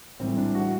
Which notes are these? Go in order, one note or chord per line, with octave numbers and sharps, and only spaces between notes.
A2 E3 G3 C4
D4
F#4